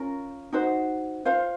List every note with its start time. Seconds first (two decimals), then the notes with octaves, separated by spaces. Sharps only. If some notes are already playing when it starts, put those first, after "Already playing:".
Already playing: C#4 F4 A#4
0.53 D#4 F#4 C5
1.25 F4 C5 F5